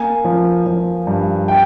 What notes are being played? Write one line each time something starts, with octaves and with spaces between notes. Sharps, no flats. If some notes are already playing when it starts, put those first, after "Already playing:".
Already playing: A#3 G#5
F3
F3
G2
G5